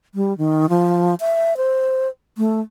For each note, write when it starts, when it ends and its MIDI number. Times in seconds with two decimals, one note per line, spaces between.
0.15 0.36 55
0.38 0.69 51
0.69 1.15 53
1.20 1.57 76
1.57 2.08 72
2.38 2.61 57